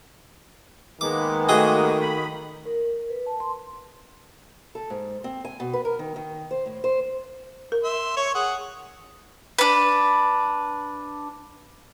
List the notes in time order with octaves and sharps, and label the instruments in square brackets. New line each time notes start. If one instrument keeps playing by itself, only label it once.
[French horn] D#3 [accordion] G#3 A#3 B3 [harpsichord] D6
[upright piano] A3 G5 [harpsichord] F#4 G#4 D#5
[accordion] B5
[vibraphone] A#4
B4
A5
C6
[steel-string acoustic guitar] A4
G#2
C4
G#5
B2
B4
A#4
D#3
D#3
C5
A2
C5
[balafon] A#4
[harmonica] E5 C6
C#5 C#6
G#4 F#5
[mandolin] D4 B4